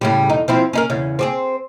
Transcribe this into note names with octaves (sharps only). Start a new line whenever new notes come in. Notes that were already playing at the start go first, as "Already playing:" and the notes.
A2 C#3 G3
E2 D#4
F3 C4 E4
C#4 D#4 A#4
E2 C#3
C4 G4 G#4